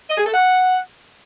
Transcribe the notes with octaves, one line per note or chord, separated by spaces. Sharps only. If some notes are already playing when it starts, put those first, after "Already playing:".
D#5
G#4
A4
F#5